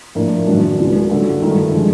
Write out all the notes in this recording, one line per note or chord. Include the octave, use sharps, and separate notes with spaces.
A2 F3 A#3 D4
F#2 D#3 F#3 B3 D4
C#2 C#3 F#3 A#3 D4
G2 D3 F#3
G2 D#3 F#3 A3
D3 F3 G#3